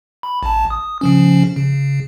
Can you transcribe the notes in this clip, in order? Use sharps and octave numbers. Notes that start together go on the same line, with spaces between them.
B5
A1 A5
D#6
C#3 F3 C#4
C#3